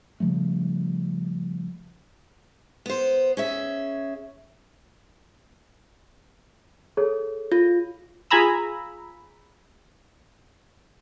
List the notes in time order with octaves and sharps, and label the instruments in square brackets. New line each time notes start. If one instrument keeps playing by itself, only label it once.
[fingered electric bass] C#3 F3 G3 A3
[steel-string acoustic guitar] B3 C5
C#4 G#4 E5
[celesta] G#4 A4 C#5
[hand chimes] F4
[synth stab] F4 G#4 G#5 A#5 B5 E6